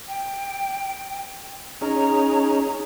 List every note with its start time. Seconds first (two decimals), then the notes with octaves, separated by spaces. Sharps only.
0.08 G5
1.81 C#4 D#4 G#4 A#5